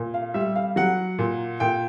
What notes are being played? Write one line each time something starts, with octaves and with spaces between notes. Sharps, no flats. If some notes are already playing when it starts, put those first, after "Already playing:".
Already playing: A#2
F5
G3 E5
F5
F#3 F#5
A#2
A#2 G5